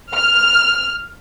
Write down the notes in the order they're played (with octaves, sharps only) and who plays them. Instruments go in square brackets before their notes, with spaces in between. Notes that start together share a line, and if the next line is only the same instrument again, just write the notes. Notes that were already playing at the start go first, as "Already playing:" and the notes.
[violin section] F6